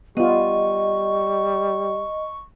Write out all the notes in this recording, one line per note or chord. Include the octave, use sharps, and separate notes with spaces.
G3 B3 F4 D#5 C#6